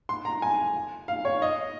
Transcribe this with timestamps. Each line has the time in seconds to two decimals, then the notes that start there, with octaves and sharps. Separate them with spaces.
0.09 C6
0.25 A#5
0.42 G#5
1.08 F5
1.25 C#5
1.42 D#5